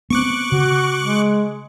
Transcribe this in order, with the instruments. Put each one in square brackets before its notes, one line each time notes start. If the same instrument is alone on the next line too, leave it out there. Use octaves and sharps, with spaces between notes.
[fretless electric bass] B3 C4 [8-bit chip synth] C#6 D6 F#6
[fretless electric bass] C#3 [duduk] F#4
[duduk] G#3